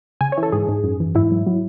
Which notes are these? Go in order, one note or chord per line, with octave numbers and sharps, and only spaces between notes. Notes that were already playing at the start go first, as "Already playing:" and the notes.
C#3 G#5
C#5
E3
A4
G#2 G#4
G#2
F#2
E3
G#2 E4
F#3
F#3